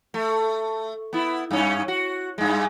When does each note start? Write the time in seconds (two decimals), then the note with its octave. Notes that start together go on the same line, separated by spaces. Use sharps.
0.14 A3
1.13 B3 E4
1.51 G2 C#4
1.88 F#4
2.38 G2 G#3